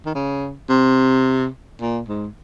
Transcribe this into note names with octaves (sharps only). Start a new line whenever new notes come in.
D#3
C#3
C3
A#2
G#2